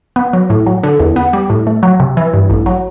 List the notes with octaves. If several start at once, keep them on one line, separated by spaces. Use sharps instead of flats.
B3
F#3
A2
F#3
D3
E2
B3
G3
A2
A3
F#3
C3
E3
G2
A1
F#3